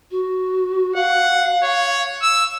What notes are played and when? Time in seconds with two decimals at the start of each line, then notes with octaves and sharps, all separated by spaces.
0.11 F#4
0.96 F5 F#5
1.63 C#5
2.22 E6